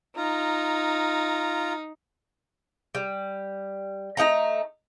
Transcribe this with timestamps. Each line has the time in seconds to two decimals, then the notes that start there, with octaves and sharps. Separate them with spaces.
0.17 D#4 F4 A#5
2.95 G3
4.17 A3 D#4 F#5 A#5